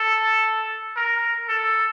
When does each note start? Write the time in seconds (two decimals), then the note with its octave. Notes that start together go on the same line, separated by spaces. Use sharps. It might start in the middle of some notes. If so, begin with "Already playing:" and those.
Already playing: A4
0.97 A#4
1.49 A4